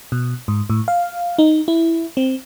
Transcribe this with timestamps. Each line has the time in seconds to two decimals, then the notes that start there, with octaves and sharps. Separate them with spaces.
0.12 B2
0.48 G#2
0.70 A2
0.88 F5
1.38 D#4
1.68 E4
2.17 C4